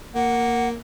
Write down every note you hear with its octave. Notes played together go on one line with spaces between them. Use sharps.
A#3 F#5